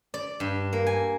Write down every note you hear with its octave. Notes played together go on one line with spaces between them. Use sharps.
D5
G2
A#3
G#5